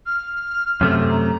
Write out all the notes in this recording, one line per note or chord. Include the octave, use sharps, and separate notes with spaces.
F6
F#2 C3 A3
A#5